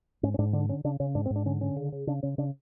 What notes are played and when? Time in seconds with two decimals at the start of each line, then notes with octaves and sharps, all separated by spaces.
0.23 G#2 C#4
0.34 C#4
0.39 G#2 D4
0.53 D3 D4
0.69 D3 C#4
0.84 C#3 D4
1.00 C#3 C#4
1.15 G#2 D4
1.26 C4
1.30 G#2
1.36 D4
1.46 D3 C#4
1.61 D3 C#4
1.76 C#3
1.92 C#3
2.07 C#3 D4
2.23 C#3 C#4
2.38 C#3 D4